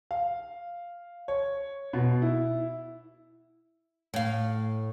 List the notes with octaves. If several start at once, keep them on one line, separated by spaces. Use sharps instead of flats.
F5
C#5
B2
E4
A2 F5